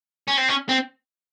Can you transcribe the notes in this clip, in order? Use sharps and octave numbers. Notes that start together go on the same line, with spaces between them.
C#4
C4
C#4
C4